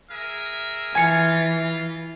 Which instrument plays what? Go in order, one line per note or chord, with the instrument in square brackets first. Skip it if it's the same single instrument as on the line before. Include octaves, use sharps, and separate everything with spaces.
[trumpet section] G#4 A#4 E5
[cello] E3 [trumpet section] F4 [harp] G#5 C#7